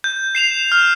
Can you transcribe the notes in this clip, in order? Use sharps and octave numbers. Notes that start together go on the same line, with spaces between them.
G6
C7 E7 F7
F6